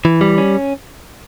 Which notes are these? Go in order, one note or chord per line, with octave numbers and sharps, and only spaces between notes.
E3
G3
C#4